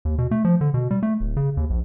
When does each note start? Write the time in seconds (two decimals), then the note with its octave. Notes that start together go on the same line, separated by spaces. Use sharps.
0.05 D#2
0.18 B2
0.31 A3
0.45 F3
0.61 D3
0.74 B2
0.91 G3
1.03 A3
1.20 D1
1.37 C#3
1.57 D#2
1.70 A#1